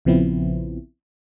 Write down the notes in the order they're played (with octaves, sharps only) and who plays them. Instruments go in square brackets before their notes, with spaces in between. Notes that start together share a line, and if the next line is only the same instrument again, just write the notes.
[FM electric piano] A#1 C#3 F3 B3 C4 E4